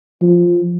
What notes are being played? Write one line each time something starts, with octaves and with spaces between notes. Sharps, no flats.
F3